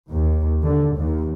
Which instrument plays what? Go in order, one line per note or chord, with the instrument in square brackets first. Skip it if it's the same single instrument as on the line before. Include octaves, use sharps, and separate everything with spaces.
[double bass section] D#2
D3
D#2